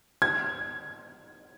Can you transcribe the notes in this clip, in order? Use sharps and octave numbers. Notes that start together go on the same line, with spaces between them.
G#6